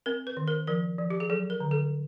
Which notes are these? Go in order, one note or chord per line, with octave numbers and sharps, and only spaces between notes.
C4 A#4
B4
D#3
A#4
F3 A#4
F3
G4
G#4
F#3 A4
A#4
D3
A4